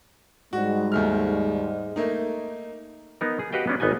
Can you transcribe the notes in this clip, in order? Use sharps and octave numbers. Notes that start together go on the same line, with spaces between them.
G#2 G3 G#3 F#4
D#2 A3 F6
A3 A#3 D#4
B3 D#4 A#4
G#4
F#4 G4 B4 D#5 F5 G5
B3 C#4 D4
G#1 B3 D#4 D#5 G#5